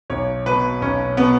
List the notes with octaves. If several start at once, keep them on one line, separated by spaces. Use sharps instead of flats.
B1 C#5
B2 B4
B1 C#4
B2 B3